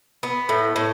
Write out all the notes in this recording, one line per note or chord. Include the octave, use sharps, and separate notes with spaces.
B3
A2
A2